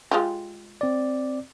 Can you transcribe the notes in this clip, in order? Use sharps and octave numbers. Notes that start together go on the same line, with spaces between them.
G#3 F4 G4
C4 D5